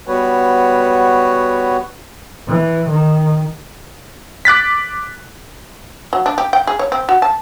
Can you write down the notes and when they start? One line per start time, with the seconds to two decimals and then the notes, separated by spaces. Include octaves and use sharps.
0.07 G3 B3 F#4 B4 C#5
2.48 E3
2.90 D#3
4.45 D6 F#6 A6 B6
6.13 F#3
6.26 D4
6.38 G4
6.53 G5
6.67 G#4
6.79 C#5
6.92 C4
7.09 F#4
7.22 A5